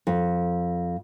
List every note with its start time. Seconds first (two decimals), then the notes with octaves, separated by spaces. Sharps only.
0.07 F2